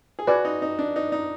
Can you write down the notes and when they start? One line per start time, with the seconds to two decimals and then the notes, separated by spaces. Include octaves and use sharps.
0.19 G#4
0.27 F#4 B4 D5 G#5
0.45 D#4
0.62 D#4
0.79 D4
0.96 D#4
1.12 D#4